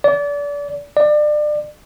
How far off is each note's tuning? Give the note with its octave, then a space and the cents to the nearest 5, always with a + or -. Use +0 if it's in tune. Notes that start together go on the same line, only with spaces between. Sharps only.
D5 -30
D5 +30